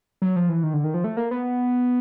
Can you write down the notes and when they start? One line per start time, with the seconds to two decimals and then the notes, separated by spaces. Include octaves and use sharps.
0.22 F#3
0.36 F3
0.49 E3
0.63 D#3
0.74 D3
0.84 D#3
0.94 F3
1.04 A3
1.17 A#3
1.31 B3